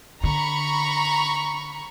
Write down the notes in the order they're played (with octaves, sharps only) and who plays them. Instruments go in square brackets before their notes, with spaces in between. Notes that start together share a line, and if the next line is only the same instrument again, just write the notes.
[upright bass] D3 [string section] A#5 B5 C#6